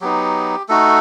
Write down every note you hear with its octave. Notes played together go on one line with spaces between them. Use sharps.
F#3 B3 D#4 G4
A3 D#4 F#4 A4